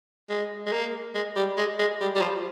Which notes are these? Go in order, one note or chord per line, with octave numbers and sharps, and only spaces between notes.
G#3
G#3
A#3
G#3
G3
G#3
G#3
G3
G3
F3